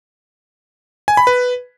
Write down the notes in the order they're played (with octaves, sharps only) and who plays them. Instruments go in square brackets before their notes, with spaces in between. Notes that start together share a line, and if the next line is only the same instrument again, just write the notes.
[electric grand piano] G#5
B5
B4